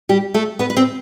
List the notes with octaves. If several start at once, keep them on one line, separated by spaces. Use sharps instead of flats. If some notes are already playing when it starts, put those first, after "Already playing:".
G3 G4
A3 A4
B3 B4
B4
C4 C5